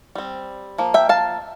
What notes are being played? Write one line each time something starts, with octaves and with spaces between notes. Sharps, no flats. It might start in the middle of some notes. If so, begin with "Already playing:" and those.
G3 C4
F3 A#3
E5 G5
F5 A5